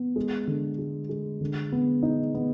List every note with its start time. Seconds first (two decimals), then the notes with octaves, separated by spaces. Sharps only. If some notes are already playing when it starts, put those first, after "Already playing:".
Already playing: B3
0.16 G#3
0.47 D3
0.79 G#3
1.09 G#3
1.41 D3
1.72 B3
2.03 D#4
2.34 B3